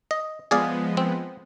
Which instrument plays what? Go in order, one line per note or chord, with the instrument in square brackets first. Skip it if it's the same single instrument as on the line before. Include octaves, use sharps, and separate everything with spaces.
[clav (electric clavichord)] D#5
[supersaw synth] F3 G#3 B3 [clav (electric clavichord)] G#4 D5 F5
[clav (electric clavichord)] C4